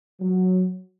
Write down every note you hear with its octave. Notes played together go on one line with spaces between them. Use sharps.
F#3